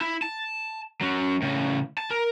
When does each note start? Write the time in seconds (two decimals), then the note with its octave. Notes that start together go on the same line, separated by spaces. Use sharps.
0.01 E4
0.22 A5
1.01 F#3 C#4
1.42 A2 C#3
1.98 A5
2.11 A#4